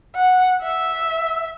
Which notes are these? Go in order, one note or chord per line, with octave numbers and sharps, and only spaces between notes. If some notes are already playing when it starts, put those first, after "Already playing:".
F#5
E5